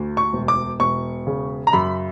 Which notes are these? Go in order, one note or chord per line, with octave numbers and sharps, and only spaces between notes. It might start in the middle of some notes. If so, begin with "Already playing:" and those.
Already playing: D2
C#6
E1
D6
E1 C#6
C#3
A#5
F#2 B5